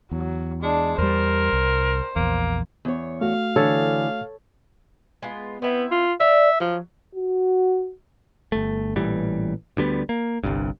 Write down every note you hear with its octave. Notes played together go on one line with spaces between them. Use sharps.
E2 F#3
G#3 D4
E2 G3 A#4 C5
C2
A#1 E2 A#3
E2 C#5
A3 F#4 F5
D3 E3 A4 C#5
G#3 B3 F4
B3 C4 E4 E5
F4
D5 E5 F5
F3 F#3
F#4
G1 A3
A1 A#2 E3 G3
D2 D3 G3 B3
A#3
G1 C2 G2